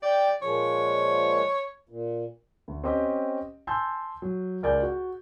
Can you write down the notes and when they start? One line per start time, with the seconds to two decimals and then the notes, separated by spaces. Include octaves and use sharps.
0.03 G4 D5 G5
0.42 A#2 F3 G#3 C#5
1.89 A#2
2.68 D2
2.84 C4 C#4 G4 D#5
3.67 G#5 A5 C6 E6 G6
4.22 F#3
4.63 C#2 A#4 D5 G#5 G6
4.82 F#4